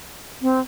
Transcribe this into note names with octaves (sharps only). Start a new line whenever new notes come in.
C4